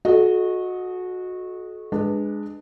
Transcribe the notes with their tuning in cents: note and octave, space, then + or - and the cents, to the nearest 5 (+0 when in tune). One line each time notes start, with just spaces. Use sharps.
F#4 -20 A4 -40 D#5 +0
G#3 +0 D4 +20 B4 +0